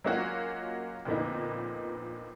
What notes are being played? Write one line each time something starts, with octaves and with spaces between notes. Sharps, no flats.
F#3 G#3 A#3 C#4 F4 F#4
F2 A#2 D3 A#3 B3 D#4